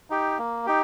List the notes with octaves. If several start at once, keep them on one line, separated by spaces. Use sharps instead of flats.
D#4 G4
A#3
D#4 G4